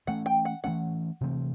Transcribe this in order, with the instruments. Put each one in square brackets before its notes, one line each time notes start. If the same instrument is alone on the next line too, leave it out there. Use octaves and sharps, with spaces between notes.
[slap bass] E3 A3 C#4 [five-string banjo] F#5
[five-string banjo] G5
F#5
[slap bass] E3 A3 C#4 [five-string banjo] F#5
[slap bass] C3 E3 A3 C4